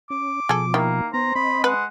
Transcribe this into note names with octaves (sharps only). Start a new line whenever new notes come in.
C#4 D6
B2 F3 G#4 A4
D#3 A#3 E4 G4
B3 C5 A#5
C4 D#5 B5
G#3 B4 F#5